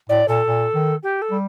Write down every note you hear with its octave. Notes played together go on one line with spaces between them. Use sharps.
A2 D5
A#2 A4
A#2
D#3
G4
A4
G3